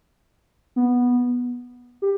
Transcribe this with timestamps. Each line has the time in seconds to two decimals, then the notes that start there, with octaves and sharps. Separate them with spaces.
0.76 B3
2.02 G4